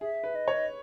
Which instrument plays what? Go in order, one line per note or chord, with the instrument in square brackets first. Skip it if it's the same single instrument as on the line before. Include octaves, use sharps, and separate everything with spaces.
[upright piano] G#4 [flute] E5
[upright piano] B4
[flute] D#5
[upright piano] C#5